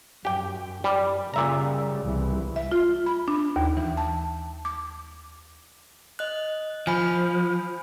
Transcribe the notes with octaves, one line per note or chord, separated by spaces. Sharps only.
F#2 G4 G5
G3
A#2 C#3 G3 E5 A#5
C2 E3
E5
F4
B5
D4
D#2
E3
A5
D6
D#5 F#6
F3 G#5 B5